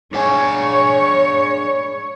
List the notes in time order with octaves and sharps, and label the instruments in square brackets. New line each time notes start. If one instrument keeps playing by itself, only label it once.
[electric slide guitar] D4 G#4 G#5 [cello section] C#5